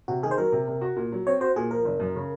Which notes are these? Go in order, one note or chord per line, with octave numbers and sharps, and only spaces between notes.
C3 F#4
D#3 G#4
C5
F#3 A#4
C3
C3
F#4
A#2
F#3
C4 C#5
F#4 C5
A#2 G#4
F3 A#4
F#1
F#2
C#3